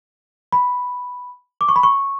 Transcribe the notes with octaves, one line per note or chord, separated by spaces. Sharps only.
B5
D6
C#6
B5
C#6